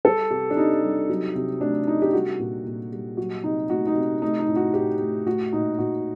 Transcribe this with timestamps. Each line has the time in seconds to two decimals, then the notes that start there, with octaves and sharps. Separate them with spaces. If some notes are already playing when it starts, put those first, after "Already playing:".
0.05 G3 A4
0.31 C3 G4
0.50 D4
0.56 C3 D#4
0.83 G3
1.09 F#3
1.35 C3
1.61 A3 D4
1.87 C3 D#4
2.02 G4
2.13 G3 F#4
2.40 A#2
2.65 A#2
2.92 G3
3.17 F#3 F#4
3.44 C3 D#4
3.69 A3 F#4
3.87 D#4
3.96 C3
4.22 A3 D#4
4.39 D#4
4.48 A2
4.56 F#4
4.74 A2 G4
5.00 A3
5.27 A3 F#4
5.53 A#2 D#4
5.78 A#2 F#4